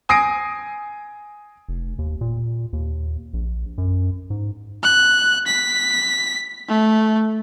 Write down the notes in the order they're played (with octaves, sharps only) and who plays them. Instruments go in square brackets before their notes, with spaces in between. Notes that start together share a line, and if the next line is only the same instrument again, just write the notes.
[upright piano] G#5 D#6 A#6 C7 D7
[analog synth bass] F1
D#2
A#2
D#2
A#1
F#2
G#2
[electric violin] F#6
B6
A3